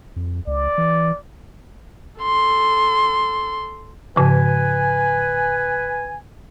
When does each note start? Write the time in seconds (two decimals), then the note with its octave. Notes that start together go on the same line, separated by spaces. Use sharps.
0.16 F2
0.47 C#2 D5
0.78 E3
2.21 A4 C6
4.16 G#2 C#3 F3 B4 G#5